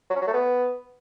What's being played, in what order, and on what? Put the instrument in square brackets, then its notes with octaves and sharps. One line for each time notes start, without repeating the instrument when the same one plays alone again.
[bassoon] F#3
C#4
F#3
A3
B3